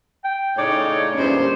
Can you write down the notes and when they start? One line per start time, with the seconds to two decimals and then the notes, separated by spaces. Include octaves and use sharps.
0.25 G5
0.58 A2 C#3 D#4 C#5 D5
1.17 E2 G2 A#2 C#4 C5